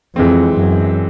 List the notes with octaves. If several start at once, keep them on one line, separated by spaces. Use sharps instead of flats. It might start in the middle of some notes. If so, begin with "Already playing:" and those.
F2 E3 G#3 C4
F#2